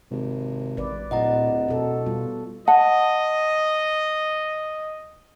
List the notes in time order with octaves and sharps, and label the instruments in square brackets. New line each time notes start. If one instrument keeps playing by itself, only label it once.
[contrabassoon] G#1 [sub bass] C3
[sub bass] A1 [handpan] B4 D5
[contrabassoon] D1 [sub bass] A#2 [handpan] E4 [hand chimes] D#5 F#5 A#5
[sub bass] B2 [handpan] F#4 A4
[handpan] G3 B3 F4
[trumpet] D#5 [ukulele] F#5 [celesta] A5